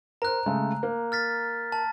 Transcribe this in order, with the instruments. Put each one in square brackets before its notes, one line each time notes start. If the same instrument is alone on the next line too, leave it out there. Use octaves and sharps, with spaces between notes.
[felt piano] A#4 C5 [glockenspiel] A#5 F#6
[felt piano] C#3 G#3 A3
A#3
[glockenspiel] F6 A6 B6
A5